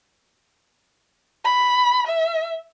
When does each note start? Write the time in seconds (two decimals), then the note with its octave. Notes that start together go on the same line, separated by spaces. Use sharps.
1.46 B5
2.07 E5